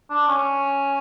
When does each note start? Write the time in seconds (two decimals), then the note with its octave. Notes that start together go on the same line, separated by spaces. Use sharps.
0.10 D4
0.28 C#4